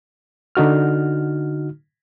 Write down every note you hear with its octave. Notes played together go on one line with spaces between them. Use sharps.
D3 D#4 F#4 F6